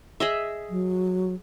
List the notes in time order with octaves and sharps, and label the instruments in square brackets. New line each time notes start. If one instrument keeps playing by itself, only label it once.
[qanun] G#4 D#5 E5
[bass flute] F#3